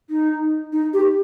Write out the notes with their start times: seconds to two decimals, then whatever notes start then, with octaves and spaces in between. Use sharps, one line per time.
0.10 D#4
0.73 D#4
0.94 G4